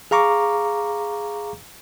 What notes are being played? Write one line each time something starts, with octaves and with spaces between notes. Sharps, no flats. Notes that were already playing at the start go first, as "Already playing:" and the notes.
G#4 F5 A#5 C#6 D6